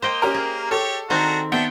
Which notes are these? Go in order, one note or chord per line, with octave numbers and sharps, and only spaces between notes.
A#3 C5 D#5 G5
C#4 G4 A#4
G#4
G4 A4 C#5
D#3 C4 D4 F#4 A#5
B3 D4 E5 G5